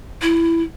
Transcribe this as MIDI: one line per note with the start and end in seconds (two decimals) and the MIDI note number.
0.22 0.62 64